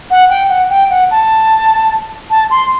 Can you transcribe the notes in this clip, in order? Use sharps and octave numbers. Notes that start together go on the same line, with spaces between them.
F#5
G5
F#5
G5
F#5
A5
A5
C6